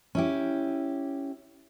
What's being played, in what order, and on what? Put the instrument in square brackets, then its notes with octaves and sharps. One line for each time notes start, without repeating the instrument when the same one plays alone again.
[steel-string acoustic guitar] C#4 E4 G4